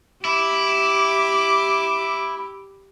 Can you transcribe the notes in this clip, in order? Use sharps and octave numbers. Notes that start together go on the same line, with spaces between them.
E4 G4 D6